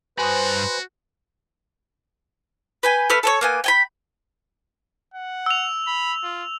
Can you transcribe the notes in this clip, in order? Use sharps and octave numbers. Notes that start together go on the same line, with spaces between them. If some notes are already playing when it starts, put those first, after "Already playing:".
G2 F#4 B4 C5 G#5 B5 D#6
B4 G5 G#5
A3 B4 B5 F6
A4 C5 C#5
A#3 B3 G#5
G5 G#5 B5
F#5
E6 F7
B5
F4